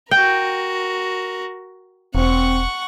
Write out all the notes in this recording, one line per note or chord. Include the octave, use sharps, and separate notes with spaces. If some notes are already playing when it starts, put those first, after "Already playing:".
F#4 A#4 G5
E1 C4 F#5 C#6